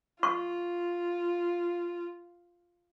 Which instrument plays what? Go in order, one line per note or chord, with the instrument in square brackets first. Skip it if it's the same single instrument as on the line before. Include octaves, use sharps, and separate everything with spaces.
[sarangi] F4 [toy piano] C#6